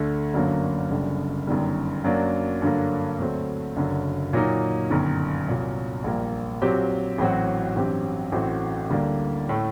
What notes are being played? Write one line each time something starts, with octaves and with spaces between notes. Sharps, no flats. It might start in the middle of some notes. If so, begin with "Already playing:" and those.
Already playing: D2 D3 A3
G1 F#2 D3 F#3 A#3
F#1 F#2 D3 G3
G1 F#2 D#3 G3
F#2 F#3 A#3 D4
G2 D3 F#3 A#3
D2 D3 F#3 A3 C4
F#1 F#2 D3 F#3
A#2 F#3 A#3 D#4
G1 F#2 D#3
C2 A#2 F#3
A#1 A#2 G3 A#3
A#2 F#3 C4 G4
A1 A2 F#3 C4 F#4
A1 G2 F#3 C4 G4
A1 A2 A3 C4 F#4
D2 D3 G3 A#3
A2 A3